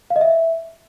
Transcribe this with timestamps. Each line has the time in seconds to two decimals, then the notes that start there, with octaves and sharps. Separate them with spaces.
0.10 F5
0.16 D#5
0.21 E5